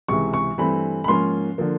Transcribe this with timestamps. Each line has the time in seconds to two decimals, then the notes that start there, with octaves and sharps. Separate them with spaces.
0.08 C#2 C3 E3 C#6
0.34 C#6
0.58 G2 E3 A3 C4 B5
1.04 B5
1.08 G#2 F3 A#3 C#4 C6
1.58 D3 F3 A#3